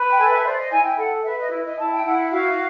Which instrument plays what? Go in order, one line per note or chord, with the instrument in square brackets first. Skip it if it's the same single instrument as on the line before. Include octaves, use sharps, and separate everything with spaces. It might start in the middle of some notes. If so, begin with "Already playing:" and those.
Already playing: [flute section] B4
G5
A4 G#5
E5
C5 D5
D#5
E4 G#5
G5
A4 F#5
B4 E5
D#5
E4
D#5
E4 A5
G5
E4 F#5
F#4 F5